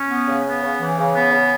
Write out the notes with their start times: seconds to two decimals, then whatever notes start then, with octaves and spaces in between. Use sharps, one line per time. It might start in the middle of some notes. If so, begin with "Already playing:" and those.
Already playing: C#4
0.10 B3
0.28 C#3
0.46 B3
0.63 C#3
0.80 E3
0.98 C#3
1.15 B3
1.33 C#3